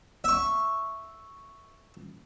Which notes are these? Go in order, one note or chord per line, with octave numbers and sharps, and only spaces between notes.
E5 C#6